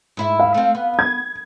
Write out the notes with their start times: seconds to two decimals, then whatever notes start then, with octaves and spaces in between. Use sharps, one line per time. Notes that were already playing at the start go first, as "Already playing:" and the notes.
0.17 G#2 E4 E5
0.40 F5
0.54 A3 C4
0.75 B3
0.99 G#6